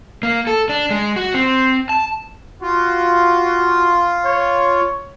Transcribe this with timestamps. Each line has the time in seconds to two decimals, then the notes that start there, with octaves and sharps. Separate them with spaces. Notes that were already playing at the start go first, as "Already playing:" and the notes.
0.23 A#3
0.47 A4
0.69 D4
0.91 G#3
1.16 F#4
1.34 C4
1.89 A5
2.62 F4 F#4
4.25 C#5